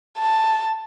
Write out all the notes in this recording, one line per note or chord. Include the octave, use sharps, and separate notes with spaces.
A5